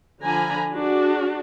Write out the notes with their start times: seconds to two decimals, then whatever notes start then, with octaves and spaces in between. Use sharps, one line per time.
0.22 D3 F3 D4 G#5 A#5 B5
0.73 D4 F#4 G#4